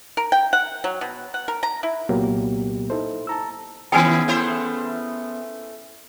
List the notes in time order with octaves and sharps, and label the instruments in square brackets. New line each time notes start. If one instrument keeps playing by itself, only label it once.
[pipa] A#4
G5
F#5
F#3
B2
F#5
A#4
A#5
E4
[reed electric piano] C2 A#2 F#3 A#3 B3 G4
D#4 E4 A4 C5
A5 A#5 E6
[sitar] D#3 E4 [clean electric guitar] B3 C#4 G#4 [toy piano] G5 G#5
[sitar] A3 E4 C5